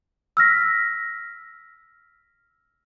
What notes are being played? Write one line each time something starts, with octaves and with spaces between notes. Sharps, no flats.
E6 F6 A#6 B6